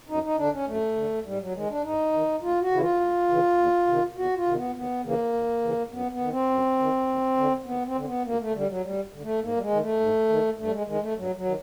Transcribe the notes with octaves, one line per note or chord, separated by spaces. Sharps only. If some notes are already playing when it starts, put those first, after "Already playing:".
F#2 D#4
D#4
D3 D4
C#4
F#2 A3
D3
G#2 G3
F#3
D#3 G#3
D4
G#2 D#4
D#3
D2 F4
F#4
C#3 E3 E4
F4
D2
C#3 E3
E2
C3 D#3
E2 F#4
F4
C3 D#3
B3
D#2 B3
C#3 E3 A#3
D#2
C#3 E3
F#2 B3
B3
D#3
C4
F#2
D#3
D#2
D3
D#2 B3
C4
D3
C4
B3
D2 A#3
A3
D3 G3
F#3
D2 G3
D3
A3
G#2 A#3
G3
G#3
D#3
A3
G#2
D#3
G2 A3
G3
G#3
D#3 G#3
A3
G2 F#3
F#3
D#3